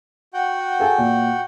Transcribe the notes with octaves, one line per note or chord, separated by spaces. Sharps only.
F#4 F#5 G5
G#4 A4 G#5
A#2